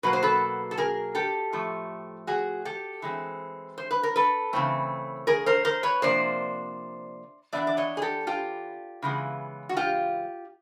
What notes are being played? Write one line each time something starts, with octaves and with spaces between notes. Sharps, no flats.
B2 F#3 A#3 B4
C5
A4 B4
A4
G#4 A#4
G4 A4
A2 F3 A3
F#4 G#4
G4 A4
E3 G#3 C4
C5
B4
A#4
A4 B4
C#3 E3 A3 C4
G#4 A#4
A#4 C5
A#4 C5
B4 C#5
C3 F3 A#3 D4 C5 D5
E3 G3 B3 D4 D5 E5
D5
C#5 D#5
G#4
G4 A4
F4 G4
C#3 E3 G#3 B3
F#4
F4 G4